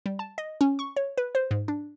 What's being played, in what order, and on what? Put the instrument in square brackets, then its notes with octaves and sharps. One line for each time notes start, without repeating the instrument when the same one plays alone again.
[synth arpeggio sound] G3
A5
D#5
C#4
C#6
C#5
B4
C5
G#2
D4